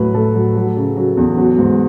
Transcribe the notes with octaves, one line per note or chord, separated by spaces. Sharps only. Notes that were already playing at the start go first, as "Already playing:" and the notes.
Already playing: A2 F#3 B4
A2 A4
F#3
F#3
C#3
F#3
E2
F#3
G#2